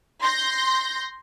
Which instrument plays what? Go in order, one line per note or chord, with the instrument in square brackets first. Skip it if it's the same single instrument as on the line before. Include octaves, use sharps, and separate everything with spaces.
[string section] C6 G6 A#6